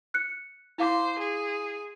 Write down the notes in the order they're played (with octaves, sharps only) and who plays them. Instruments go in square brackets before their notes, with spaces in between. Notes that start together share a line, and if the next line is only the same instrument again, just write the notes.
[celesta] F#6 C#7
[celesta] E4 F5 D6 [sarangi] C5
[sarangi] G#4